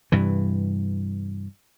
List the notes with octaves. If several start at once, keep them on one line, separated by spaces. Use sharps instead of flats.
G2 C3 E3